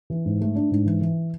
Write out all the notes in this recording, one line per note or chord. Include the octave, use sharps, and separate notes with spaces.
E3
G#2
A3
D4
G#2
E3
E3